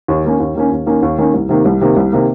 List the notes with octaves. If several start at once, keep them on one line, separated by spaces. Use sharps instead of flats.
D#2
D#3 A#3 C#4
D#2
D#3 A#3 C#4
D#2
D#3 A#3 C#4
D#2
D#3 A#3 C#4
C2
C3 D#3 A#3
C2
C3 D#3 A#3
C2
C3 D#3 A#3